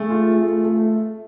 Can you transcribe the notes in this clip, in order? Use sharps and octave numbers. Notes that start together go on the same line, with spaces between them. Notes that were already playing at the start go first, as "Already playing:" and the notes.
Already playing: A3 G#4
F4
A3
A3